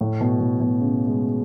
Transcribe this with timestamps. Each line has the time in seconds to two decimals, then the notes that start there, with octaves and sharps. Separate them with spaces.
0.01 A2
0.21 B2
0.40 A2
0.61 B2
0.80 C#3
1.07 G#3